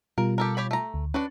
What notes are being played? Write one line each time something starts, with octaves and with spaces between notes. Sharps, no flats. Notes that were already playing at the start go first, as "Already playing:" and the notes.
B2 G3 F4 A#4
G4 A4 A#4
G4 C#5 B5
A3 A#5
D2
C#4 D4 F#4 B4 C#6